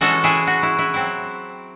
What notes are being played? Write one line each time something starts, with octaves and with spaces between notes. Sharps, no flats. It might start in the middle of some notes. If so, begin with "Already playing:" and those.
E3 G#3 C#4 E4 F#4 A4
E4 G#4
F#4
E4
E4
F#3 C4 E4